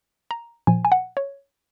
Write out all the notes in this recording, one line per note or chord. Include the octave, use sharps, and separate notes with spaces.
A#5
A#2 F3 G#5
G#5
F#5
C#5